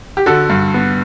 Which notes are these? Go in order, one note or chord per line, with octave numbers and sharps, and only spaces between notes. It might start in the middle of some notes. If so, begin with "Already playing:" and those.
G4
D3 F#4 A4
G2
B3